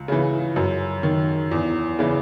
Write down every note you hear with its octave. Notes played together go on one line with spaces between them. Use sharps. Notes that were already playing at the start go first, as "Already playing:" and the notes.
Already playing: C#2
C#3 E3
F#2
D#3
E2
C#3 E3